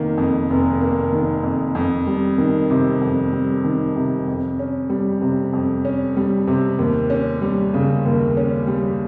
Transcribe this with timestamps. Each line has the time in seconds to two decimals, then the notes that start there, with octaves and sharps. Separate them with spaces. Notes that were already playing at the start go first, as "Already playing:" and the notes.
Already playing: F1 D#3 A#3
0.18 F2
0.50 F1
0.81 A#3
1.13 D#3
1.43 F2
1.75 F2
2.07 G3
2.38 D#3
2.70 C3
3.02 F2
3.33 G3
3.64 D#3
3.96 C3
4.28 F2
4.59 C#4
4.90 G3
5.22 C3
5.53 F2
5.85 C#4
6.17 G3
6.47 C3
6.79 D#2
7.10 C#4
7.42 G3
7.74 C#3
8.06 D#2
8.37 C#4
8.67 G3